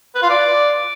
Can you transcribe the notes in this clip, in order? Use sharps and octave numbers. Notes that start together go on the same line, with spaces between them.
B4
F4
D5